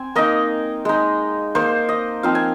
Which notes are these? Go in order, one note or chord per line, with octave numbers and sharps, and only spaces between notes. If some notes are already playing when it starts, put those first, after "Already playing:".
Already playing: C4 G#5
A#3 D#4 D#5
G#3 D#4
A#3 D#4 C5
D#5
F3 C4 D#4 F5
G#5